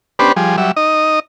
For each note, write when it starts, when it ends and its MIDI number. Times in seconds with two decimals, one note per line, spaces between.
0.19 0.32 59
0.19 0.32 61
0.19 0.32 62
0.19 0.32 67
0.19 0.32 71
0.19 0.32 72
0.36 0.56 53
0.36 0.56 55
0.36 0.56 68
0.58 0.71 54
0.58 0.71 55
0.58 0.71 76
0.76 1.20 63
0.76 1.20 75